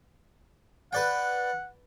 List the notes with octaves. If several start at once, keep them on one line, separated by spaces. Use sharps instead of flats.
B4 D5 F#5 G5